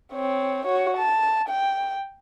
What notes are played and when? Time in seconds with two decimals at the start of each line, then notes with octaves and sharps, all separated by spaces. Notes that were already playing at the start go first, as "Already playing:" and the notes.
0.13 C4 C#5
0.65 F#4 C#5
0.97 A5
1.49 G5